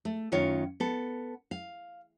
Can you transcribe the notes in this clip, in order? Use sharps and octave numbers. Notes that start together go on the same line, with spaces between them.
A3
F#2 D#3 F4 C#5 F5
B3 A4
F5